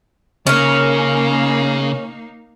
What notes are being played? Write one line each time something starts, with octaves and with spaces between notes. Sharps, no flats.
C#3 A#3 C#4 D#4 A#4